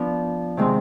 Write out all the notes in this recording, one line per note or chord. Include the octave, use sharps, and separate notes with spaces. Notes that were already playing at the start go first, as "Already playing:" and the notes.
Already playing: F3 B3 D4
C3 D#3 G#3 C4